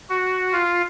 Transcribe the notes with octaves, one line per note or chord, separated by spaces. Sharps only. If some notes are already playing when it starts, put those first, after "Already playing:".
F#4
F4